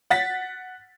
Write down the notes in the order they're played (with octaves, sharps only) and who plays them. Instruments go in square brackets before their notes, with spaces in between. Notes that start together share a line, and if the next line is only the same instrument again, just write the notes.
[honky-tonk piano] F#5 A6 B6